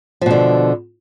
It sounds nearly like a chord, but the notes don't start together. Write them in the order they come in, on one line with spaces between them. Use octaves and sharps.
F3 B2 D3